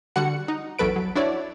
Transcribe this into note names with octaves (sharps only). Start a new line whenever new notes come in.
D3 G3 F#4 F#5 C#7
D#4
A1 E2 F#3 A4 B4 D7
F#3
D4 E4 F#4 C#5 D5